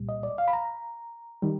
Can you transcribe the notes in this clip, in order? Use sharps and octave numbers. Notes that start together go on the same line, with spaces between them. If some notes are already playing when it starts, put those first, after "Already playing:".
Already playing: C2 A#2 G3
D#5
D5
F5
B5
A#5
D#3 G3